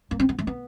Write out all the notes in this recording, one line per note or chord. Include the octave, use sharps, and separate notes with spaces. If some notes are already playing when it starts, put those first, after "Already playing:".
A#3
C4
B3
A3
B3